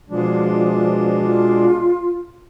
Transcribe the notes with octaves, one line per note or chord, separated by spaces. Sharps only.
B2 F3 G#3 D4
F4